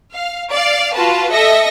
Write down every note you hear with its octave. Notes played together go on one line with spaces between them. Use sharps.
F5
D5 F5
F4 F#4 B4 A5
A4 D#5 E5 A#6 C#7